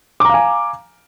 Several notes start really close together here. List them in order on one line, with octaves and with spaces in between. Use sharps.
D6 A#5 F5 G#5